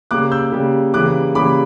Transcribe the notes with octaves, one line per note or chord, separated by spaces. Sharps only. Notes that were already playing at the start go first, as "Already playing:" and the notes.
C#3 G3 A#3 D6 F#6
E6 G6
C#3 G3 A#3
C#3 E3 G3 A#3 D6 F#6
C#3 E3 G3 A#3 B5 D6